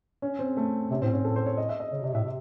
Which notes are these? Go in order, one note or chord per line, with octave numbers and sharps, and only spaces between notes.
C#4
C4
A3
C3 C#4
A2 C4
G#2 C#4
A2 A4
C5
C#5
D#5
E5
D#5
C#3 C#5
C3 D#5
A2 E5
C3